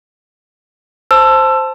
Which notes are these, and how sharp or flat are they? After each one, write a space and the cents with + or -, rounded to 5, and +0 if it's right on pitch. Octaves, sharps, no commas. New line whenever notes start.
C5 +0 A5 +0 E6 +25